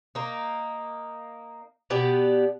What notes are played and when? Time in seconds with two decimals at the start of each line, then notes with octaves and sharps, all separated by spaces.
0.15 A#3 D#4
1.90 B2 B3 G4 D5